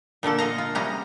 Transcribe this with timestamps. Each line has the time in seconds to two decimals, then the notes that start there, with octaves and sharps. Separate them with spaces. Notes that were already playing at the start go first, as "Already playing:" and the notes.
0.23 A#2 D3 A#3 A4
0.38 F4 D#5 F5 A#5
0.58 F4
0.75 C3 G3 C#4 F#4 G#4 A#5